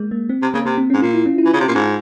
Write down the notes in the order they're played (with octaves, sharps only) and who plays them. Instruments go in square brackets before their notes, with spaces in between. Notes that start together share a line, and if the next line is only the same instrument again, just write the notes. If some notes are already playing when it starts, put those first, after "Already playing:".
Already playing: [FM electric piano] G#3 A#3
A#3
C4
[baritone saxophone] C3
[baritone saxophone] C#3 [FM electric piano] A#3
[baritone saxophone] C3 [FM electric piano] A#3
[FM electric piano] C4
[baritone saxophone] G#2 [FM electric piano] C#4
[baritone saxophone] A#2 [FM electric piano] F4
[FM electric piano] E4
C#4
E4
[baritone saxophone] E3
C#3
C3
A#2
[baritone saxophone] G#2 [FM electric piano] F4